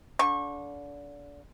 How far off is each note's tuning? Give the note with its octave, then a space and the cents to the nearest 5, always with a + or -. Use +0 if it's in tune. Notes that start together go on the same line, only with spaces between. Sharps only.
D3 -30 C#6 -30